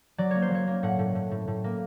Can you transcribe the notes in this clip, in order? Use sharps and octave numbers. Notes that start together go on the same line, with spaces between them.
F#3 D5
A#3 C#5
C5
F#3 C#5
A#3
A2 F#5
A2
A2
A2
A2
A#3